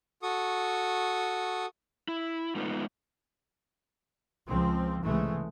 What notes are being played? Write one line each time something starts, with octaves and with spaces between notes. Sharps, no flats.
F#4 A4 C#6 D#6
E4
G#3 A3 B3 D#4 F4
C#2 F3 C4
C2 A2 C#3 E3 G#3 A3